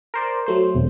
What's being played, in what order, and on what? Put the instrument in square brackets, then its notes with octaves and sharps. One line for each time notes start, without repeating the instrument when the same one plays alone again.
[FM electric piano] A#4 C5 D5
F#3 A3 C5
[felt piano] E1